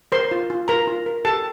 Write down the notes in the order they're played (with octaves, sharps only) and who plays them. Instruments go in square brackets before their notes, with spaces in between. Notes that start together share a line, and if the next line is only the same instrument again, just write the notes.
[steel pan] A#4 C5 C6
F4
F4
F4 A#4 A#5
F4
A#4
G4 A4 A5